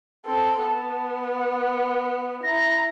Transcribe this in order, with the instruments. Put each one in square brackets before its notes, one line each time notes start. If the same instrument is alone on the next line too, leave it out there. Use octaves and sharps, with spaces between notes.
[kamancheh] C4 A4
[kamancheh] B3 [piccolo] A5
[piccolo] F#5
[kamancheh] E4 A#5 [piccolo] A#6